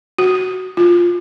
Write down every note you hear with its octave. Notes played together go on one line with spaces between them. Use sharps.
F#4
F4